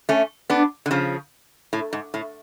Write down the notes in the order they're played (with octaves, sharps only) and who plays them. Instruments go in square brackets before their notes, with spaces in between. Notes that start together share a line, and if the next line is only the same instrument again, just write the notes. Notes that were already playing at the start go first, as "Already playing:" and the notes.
[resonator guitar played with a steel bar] A3 C#4
B3 D4
D3
C#3 F3
A2
G#2
A2